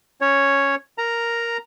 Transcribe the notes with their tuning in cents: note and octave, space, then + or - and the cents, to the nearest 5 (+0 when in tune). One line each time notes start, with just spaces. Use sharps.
C#4 +0 C#5 +0
A#4 +0 A#5 +0